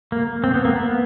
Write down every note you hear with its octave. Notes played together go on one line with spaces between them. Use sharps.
A#3
C4
B3
A#3
B3